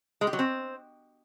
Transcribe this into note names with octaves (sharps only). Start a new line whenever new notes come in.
G#3
G4
F#3
C4